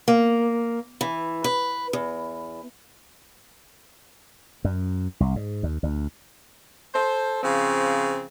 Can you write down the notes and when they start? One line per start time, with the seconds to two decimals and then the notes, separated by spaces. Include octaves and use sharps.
0.08 A#3
1.01 E3
1.44 B4
1.93 E2
4.64 F#2
5.20 C2
5.36 G#2
5.63 D#2
5.83 D2
6.94 A4 C5
7.43 C#3 F3 C4